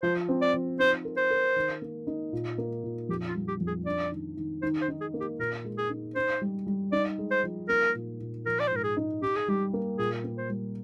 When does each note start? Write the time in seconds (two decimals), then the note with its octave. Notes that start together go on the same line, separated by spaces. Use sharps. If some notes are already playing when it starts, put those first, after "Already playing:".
0.03 F3 C5
0.29 C4
0.42 D5
0.54 F3
0.79 D#4 C5
1.05 A#4
1.17 C5
1.31 A#4
1.56 D#3
1.82 A#3
2.07 D#4
2.33 A#2
2.58 A#3
2.84 A#2
3.09 F2 G4
3.28 F4
3.35 G3
3.48 G4
3.61 F2
3.67 G#4
3.86 D4 D5
4.12 D#3
4.37 D#3
4.62 D#3 C5
4.82 C5
4.88 D#4
5.01 G#4
5.14 A#3
5.20 G4
5.39 A#2 A#4
5.65 G#3
5.78 G#4
5.90 D#4
6.15 D#4 C5
6.41 G3
6.67 G3
6.92 D#4 D5
7.18 G#3
7.31 C5
7.44 F3
7.69 A#3 A#4
7.95 A#2
8.20 A#2
8.46 F3 A#4
8.60 D5
8.68 C5
8.71 G#2 A#4
8.83 G#4
8.97 D#4
9.22 D#4 G4
9.36 G#4
9.48 G3 G4
9.73 A#3
9.98 A#2 G#4
10.24 A#3
10.38 C5
10.50 G3